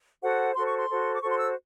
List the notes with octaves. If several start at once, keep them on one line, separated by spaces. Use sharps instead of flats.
F#4 A4 C5 F#5
F#4 A4 C5 C6
C#6
C6
F#4 A4 C5
D6
F#4 A4 C5 C#6
C6
E6